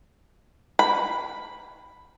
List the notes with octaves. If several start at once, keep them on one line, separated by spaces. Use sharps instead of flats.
B5